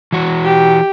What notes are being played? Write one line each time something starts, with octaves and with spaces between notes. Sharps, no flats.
E3 F#4
G4